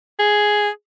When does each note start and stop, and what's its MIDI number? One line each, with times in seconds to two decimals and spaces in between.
0.19 0.69 68